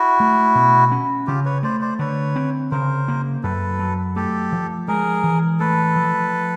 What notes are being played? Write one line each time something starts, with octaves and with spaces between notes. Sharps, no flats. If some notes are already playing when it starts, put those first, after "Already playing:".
Already playing: E4 F#4
A3
B2
C#4
C#3 F4 G4
B4 C#5
A3 C5 D5
C5 D5
D3 B4 C#5
C4
C#3 A#4 C5
A#3
F#2 A4 B4
F#3
A3 G4 A4
F3
G#3 G#4 A#4
E3
A3 A4 B4
F3